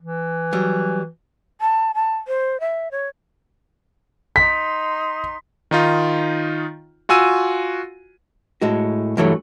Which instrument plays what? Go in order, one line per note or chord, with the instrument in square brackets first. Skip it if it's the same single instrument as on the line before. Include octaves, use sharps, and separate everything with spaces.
[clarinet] E3
[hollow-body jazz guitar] F#3 G3
[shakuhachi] A5
A5
C5
E5
C#5
[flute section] D#4 C6 [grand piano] B6
[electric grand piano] D#3 D#4 F4
F4 F#4 G#5 E6 D#7
[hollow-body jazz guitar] A2 G#3 F#4
G2 E3 F#3 A3